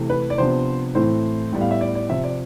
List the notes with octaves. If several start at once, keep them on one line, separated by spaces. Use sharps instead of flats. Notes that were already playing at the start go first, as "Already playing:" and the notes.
Already playing: C3 E3 A3
B4
D5
C3 F3 B3 D4 C5
A2 E3 A3 C4 C5
A2 G3 B3
F5
E5
D5
D5
C3 F3 C4 E5
D5